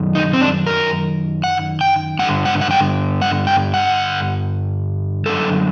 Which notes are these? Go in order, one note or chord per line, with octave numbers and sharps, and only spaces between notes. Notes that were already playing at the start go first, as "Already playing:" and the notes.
Already playing: F#2 D#3
D#4
C4
D4
A#4
F#5
G5
G2 D3 F#5
F#5
F#5
G5
F#5
G5
F#5
F#2 D3 A4